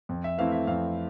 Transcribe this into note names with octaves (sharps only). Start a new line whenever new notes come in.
F2
E5
E3 A3 C4 E4 F5
E5
F2 F5